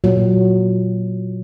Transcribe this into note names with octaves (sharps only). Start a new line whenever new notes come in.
A#2 F#3